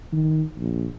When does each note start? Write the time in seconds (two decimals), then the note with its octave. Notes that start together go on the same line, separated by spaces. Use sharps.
0.12 D#3
0.58 A#1